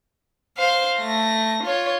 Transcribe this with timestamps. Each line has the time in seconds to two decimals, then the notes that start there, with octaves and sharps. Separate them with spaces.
0.58 C5 F5
0.98 A3 A#6
1.63 F4 C#5